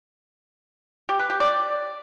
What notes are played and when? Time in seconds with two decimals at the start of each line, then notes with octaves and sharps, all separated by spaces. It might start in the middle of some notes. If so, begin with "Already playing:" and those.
1.09 G4
1.19 B4
1.30 G4
1.40 D5